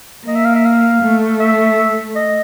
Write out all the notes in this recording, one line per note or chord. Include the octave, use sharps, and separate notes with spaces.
A#3 D#5
E5
F5
E5
F5
A3
E5
D#5